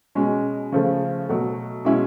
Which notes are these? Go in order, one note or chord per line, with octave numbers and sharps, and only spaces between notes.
B2 G#3 C#4
C#3 F3 A3
B2 F#3 A3
B2 G#3 C#4 E4